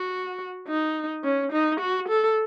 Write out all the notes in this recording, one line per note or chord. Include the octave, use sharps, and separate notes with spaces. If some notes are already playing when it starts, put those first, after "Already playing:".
Already playing: F#4
D#4
C#4
D#4
F#4
A4